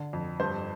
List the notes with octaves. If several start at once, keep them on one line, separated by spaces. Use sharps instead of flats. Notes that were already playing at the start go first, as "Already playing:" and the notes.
Already playing: D3
F2
G2 C5